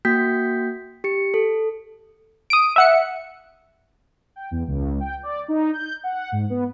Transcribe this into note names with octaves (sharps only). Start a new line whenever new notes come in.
A#3 F#4 G5 G6 B6
G4 C#7
A4
D#6 D7
E5 F#5 C#7
G5
E2
C#2
G5
D5
D#4
G6
F#5
G#2
B3